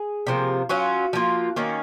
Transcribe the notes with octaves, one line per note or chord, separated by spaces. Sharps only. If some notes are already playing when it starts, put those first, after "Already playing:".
Already playing: G#4
C3 F3 A#3
F#3 C#4 F4 F#4
F3 A#3 F4
D#3 A#3 C#4